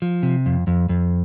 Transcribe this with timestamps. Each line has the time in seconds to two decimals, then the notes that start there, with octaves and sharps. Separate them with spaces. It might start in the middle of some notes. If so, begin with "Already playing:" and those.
0.02 F3
0.23 C3
0.46 F2
0.67 F2
0.89 F2